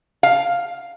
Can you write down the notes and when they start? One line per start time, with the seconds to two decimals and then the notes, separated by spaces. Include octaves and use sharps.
0.23 F5